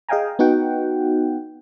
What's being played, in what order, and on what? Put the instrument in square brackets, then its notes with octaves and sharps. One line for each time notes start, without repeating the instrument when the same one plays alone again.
[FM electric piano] G#4 D#5 F5 G5 G#5 A#5
B3 D#4 F#4 F#5 G5